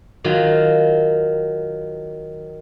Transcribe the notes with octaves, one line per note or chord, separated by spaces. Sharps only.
D#3 F#3 F4